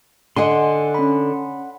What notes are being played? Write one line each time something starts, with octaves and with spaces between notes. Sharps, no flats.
D3 D#5 F#5 G#5 C6
C#4 B5